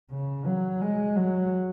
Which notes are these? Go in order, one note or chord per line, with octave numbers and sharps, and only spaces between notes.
C#3
F#3
G#3
F#3